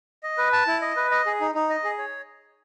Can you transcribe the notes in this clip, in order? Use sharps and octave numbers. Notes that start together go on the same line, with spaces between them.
D#5
B4
A5
E4
D#5
B4
D#5
G#4
D#4
D#4
D#5
G#4
C#5